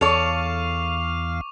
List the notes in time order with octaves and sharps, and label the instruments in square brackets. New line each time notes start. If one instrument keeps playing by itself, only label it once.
[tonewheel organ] E2 F5 [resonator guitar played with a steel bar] A4 C#5 [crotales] C#6 D6 F7